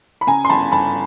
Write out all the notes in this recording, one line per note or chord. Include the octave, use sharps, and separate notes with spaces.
B5
C#3 G#5 A#5
C6
G1 A5 B5
G1 A5 B5